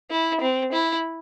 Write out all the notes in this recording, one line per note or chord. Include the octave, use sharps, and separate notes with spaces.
E4
C4
E4